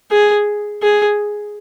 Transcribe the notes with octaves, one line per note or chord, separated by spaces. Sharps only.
G#4
G#4